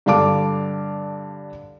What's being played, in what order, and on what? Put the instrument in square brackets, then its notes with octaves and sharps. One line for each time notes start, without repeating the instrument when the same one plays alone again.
[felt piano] G2 D3 F5 A5 D6